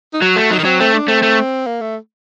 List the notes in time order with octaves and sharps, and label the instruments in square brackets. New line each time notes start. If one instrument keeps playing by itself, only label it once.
[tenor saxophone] D#4
[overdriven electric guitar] F#3 [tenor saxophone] F#4
[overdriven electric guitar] A3
[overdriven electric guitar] F#3 [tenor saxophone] D#4
[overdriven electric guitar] D#3
[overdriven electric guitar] F#3 [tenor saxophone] C4
[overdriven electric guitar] A3 [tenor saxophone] C4
[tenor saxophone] D4
[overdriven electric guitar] A3 [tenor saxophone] C4
[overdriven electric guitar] A3
[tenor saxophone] A#3
A3